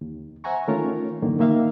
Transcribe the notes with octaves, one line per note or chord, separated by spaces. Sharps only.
D#2
C5 E5 F#5 G#5 A#5 C#6
D#3 A3 C#4 F4 A#4 C#5
F#2 A2 D3 D#3 A#3
D#3 A#3 E5 F5